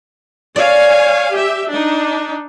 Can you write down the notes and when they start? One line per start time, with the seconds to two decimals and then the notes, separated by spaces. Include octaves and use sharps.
0.56 C#5 D5 F5 G#5
1.32 G4 E5
1.70 D4 D#4